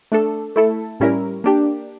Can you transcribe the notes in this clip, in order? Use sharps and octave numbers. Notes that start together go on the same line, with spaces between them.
A3 D4 A4
A3 E4 A4
A2 G3 C#4 E4 A#4
A#3 D4 G4